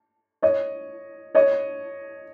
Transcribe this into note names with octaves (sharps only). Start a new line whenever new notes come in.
C#5 D#5
C#5 D#5